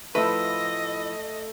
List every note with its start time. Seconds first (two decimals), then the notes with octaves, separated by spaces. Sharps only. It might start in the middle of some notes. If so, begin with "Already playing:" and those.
0.15 A2 F3 A3 E4 B4 D#5 E6